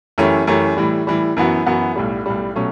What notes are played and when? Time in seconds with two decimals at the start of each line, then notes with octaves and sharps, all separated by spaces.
0.18 F#2 E3 A3 C#4 G4
0.47 F#2 E3 A3 C#4 G4
0.77 A2 E3 G3
1.07 A2 E3 G3
1.37 F#2 E3 B3 F#4
1.66 F#2 E3 B3 F#4
1.96 B1 A2 G3
2.26 B1 A2 G3
2.56 B2 F#3 A3 C#4